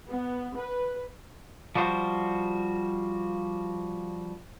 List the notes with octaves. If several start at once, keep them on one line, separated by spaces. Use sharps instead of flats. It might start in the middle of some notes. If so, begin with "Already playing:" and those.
B3
B4
F3 G3 F#4 C5